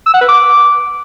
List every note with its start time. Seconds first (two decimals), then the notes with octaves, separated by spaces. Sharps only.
0.06 E6
0.14 F#5
0.21 B4
0.28 D6